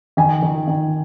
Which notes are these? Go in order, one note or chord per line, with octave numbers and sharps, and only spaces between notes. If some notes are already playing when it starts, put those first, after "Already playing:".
D#3 G#5
D#3
D#3